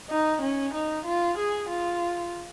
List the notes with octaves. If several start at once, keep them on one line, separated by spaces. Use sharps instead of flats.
D#4
C#4
D#4
F4
G#4
F4